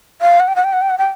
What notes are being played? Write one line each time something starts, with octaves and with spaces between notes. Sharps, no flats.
F5
F#5
G5
F#5
G5
F#5
G5
F#5
G5